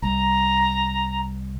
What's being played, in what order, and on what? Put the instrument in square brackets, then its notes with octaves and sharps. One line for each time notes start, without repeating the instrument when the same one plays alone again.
[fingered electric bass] C2 [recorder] A#5